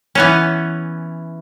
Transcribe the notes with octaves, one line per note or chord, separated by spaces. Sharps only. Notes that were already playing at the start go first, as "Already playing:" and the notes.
E3 B3 C#4